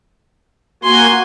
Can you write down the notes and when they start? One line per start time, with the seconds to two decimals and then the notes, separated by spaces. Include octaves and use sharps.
0.83 A#3 F#4 G#5 C6